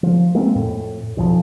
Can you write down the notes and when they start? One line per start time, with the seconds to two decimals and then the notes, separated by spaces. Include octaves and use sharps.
0.03 F3
0.35 G#3 A#3 C4 C#4
0.55 F2 A2
1.17 B1 F2 E3 F3